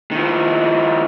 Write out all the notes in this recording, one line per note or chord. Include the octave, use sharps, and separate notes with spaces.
D#3 F3